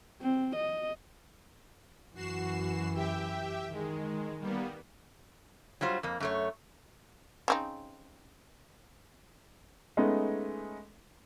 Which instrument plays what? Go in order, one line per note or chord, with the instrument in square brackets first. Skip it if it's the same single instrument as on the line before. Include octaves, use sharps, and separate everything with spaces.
[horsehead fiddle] C4
D#5
[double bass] F#2 E3 [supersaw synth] F#4 C7 E7
[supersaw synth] G4 E5 G5
[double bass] D#3 [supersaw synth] G#3
[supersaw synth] G3 A#3 B3
[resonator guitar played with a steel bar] F#3 G3 F4 C5
F2 A#3
F#2 A3 C#5
[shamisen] C#3 C4 D#4
[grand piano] G#3 A3 B3 C#4 D#4